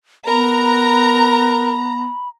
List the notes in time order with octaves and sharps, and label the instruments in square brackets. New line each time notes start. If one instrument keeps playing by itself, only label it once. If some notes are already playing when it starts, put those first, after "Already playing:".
[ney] B3 [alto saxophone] A#4 [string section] A#5 [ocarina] B5